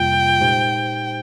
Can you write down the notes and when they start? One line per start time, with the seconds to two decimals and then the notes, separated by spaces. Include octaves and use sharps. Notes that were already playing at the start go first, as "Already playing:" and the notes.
Already playing: F2 C3 G3 A#3 F4 G5
0.41 A#2 G#3 D#4 G4 C5